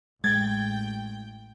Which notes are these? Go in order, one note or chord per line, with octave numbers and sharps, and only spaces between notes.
A1 G#3 G5 G#6 A6